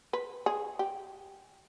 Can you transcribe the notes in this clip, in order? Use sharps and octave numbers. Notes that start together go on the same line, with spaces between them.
B4
G#4
G4